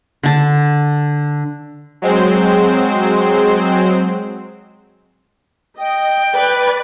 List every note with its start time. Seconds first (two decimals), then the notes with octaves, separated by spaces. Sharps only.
0.23 D3 A5
2.02 F#3 G#3 C4 C5
5.79 D#5 G5
6.33 B4 D5